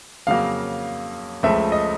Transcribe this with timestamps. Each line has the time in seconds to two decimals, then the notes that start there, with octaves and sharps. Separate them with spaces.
0.27 F2 C#3 F#3 A#3 F5
1.43 C#2 C#3 F3 A3 E5
1.72 D#5